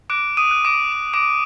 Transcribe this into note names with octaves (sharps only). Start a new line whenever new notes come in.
D6 F#6 D7
D#6 D#7
F#6
D6 D7
D6
D6 D7